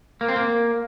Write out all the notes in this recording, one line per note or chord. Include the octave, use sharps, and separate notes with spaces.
A#3
C4
A#3